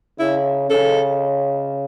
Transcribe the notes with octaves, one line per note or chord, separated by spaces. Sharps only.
C#3 E4
C#3 A4